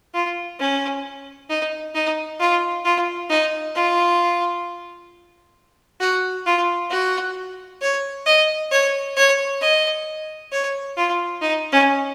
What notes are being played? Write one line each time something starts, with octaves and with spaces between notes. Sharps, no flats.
F4
C#4
D#4
D#4
F4
F4
D#4
F4
F#4
F4
F#4
C#5
D#5
C#5
C#5
D#5
C#5
F4
D#4
C#4